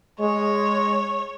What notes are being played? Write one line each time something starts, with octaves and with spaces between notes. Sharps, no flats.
G#3 C#5